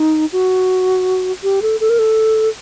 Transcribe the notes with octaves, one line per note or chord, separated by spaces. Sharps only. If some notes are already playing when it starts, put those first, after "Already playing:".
Already playing: D#4
F#4
G4
A4
A4
A#4
A4